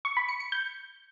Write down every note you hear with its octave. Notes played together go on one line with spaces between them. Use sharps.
C#6
B5
C#7
C#7
G6